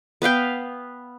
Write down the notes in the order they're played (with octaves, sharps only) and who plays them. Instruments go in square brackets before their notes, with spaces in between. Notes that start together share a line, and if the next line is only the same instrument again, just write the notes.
[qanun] B3 B4 F5 G5